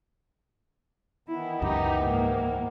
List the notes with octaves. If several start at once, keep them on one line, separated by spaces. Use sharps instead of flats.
D#3 E3 B3 E4
C#2 F#2 D#4 G4
G#2 A#3